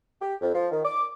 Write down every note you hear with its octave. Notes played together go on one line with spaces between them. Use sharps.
G4
F2
F3
D#3
D6